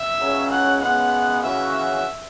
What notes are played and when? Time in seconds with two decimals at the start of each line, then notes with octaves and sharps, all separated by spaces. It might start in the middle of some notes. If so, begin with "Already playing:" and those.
Already playing: E5
0.19 C#2 C#3 F#3 C#4
0.50 F#5
0.81 F#2 C#3 G#3 B3 F#5
1.42 C#3 E3 C#4 F#4 E5
1.73 E5